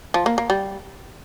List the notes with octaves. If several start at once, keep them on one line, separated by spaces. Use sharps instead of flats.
F3
A#3
A#3
G3